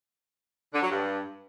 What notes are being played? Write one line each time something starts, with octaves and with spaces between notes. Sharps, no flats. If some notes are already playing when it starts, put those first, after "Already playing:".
D3
F#3
G2